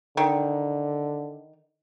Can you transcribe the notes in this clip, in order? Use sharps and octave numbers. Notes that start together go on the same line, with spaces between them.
D3 D#3